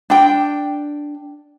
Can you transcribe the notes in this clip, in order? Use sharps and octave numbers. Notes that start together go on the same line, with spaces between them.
D4 G5